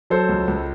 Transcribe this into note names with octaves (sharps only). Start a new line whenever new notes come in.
F#3 A4 C5
C#2
C#2